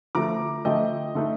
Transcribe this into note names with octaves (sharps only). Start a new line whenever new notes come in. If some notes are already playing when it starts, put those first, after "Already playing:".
D3 F3 A3 A#5 D6
D3 F3 A3 D#5 G5
D3 A3 D#4